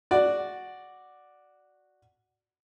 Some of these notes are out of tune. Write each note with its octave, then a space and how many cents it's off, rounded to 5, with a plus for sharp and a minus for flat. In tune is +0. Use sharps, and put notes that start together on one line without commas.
F#4 +0 D5 +0